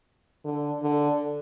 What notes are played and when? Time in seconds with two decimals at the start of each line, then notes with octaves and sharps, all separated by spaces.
0.45 D3
0.83 D3